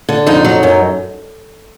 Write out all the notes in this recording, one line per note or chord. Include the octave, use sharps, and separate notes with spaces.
D3
F2 D#4
F#3
F#2